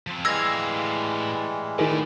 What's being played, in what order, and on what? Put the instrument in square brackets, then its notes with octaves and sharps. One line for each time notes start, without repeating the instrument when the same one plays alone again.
[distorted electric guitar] F3 C4
[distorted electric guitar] A2 F5 [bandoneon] E3 G3 G#3 [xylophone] E6 G#6 A#6
[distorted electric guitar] A2 A3 [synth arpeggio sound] D#3 G#4